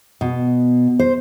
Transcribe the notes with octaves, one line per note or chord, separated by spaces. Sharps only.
B2
C5